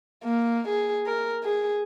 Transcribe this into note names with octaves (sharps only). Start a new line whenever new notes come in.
A#3
G#4
A#4
G#4